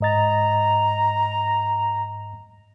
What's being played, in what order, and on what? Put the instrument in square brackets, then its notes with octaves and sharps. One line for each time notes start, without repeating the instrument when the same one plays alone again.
[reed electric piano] G#2 D#5 A6 [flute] A#5